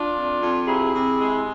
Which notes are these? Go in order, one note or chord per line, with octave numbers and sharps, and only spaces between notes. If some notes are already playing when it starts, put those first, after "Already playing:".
Already playing: D4 F4
F2
F2
C3 E4 G#4
C3
G#3